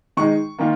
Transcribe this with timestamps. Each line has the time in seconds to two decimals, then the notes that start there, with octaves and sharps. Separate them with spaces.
0.17 D#3 G#3 D#4 C#6
0.59 D#3 A#3 F4